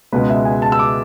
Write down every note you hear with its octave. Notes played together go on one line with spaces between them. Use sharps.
C#2 B2 G#3 B4
E5
G#5
A5
E6
D6